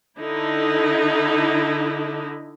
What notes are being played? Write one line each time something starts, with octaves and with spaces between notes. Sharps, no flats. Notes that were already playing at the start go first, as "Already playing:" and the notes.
D3 D#4 E4